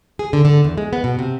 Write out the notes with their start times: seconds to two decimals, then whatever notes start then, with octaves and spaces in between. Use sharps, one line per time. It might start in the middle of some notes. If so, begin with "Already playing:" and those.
0.19 G#4
0.33 D3
0.45 D3
0.64 E2
0.78 G#3
0.93 B3
1.04 B2
1.19 C3